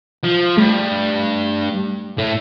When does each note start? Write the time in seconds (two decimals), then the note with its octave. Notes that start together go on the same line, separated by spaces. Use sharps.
0.23 F3
0.57 G2 A3
2.18 A2